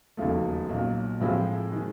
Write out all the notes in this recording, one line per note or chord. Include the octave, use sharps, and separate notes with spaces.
E1 D#2 C#3 F3 A3
B1 A#2 F#3
A2 F3 G#3 C4 E4
D#3 G#3